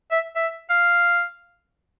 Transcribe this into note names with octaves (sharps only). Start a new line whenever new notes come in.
E5
E5
F5